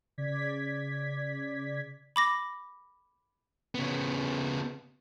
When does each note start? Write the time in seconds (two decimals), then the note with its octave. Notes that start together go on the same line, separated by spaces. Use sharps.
0.18 C#3 D5 G#6 B6
2.16 B5 D6 A#6
3.75 C#3 B3